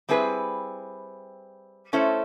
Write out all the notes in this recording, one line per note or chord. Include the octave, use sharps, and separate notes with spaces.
G3 C4 E4 G#4 B4
A3 C#4 E4 A4 C5